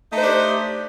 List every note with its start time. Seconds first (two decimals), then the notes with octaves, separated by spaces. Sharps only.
0.09 D#4
0.13 A3
0.17 C5
0.21 D4
0.25 G4